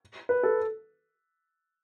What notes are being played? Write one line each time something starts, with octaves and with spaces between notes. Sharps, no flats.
B4
A4